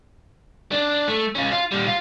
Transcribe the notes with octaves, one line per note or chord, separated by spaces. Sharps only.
D4
A3
C#4 F4
F4
A#2 G3
F4